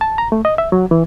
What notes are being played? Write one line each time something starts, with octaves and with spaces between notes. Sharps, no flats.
A5
A#5
A3
D#5
E5
F#3
E3